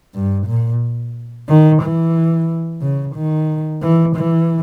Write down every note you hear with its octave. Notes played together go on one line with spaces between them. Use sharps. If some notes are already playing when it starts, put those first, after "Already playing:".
G2
A#2
D#3
E3
C#3
D#3
E3
E3